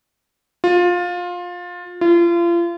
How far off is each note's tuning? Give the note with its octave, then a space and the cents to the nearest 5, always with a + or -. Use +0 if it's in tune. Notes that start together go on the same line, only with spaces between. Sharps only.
F4 +20
F4 -35